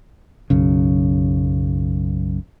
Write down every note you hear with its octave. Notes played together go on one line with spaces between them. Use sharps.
B1 F#2 C#3